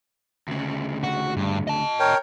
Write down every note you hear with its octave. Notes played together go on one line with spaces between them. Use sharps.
D2 C#3
F#4
G2
D#5 A5
A#4 C#5 G5